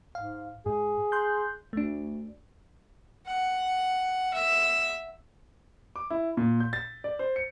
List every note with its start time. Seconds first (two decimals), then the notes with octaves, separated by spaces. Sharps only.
0.15 G#2 F5
0.66 G#2 G#4
1.12 C6 F#6 G6
1.73 D2 A3 D4
3.27 F#5
4.33 E5
5.96 D6
6.10 E4
6.37 A#2
6.60 G6
6.73 A6
7.04 D5
7.19 C5
7.36 C#7